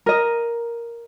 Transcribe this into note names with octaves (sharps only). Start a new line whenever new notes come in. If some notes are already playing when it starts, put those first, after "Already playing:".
A#4 D#5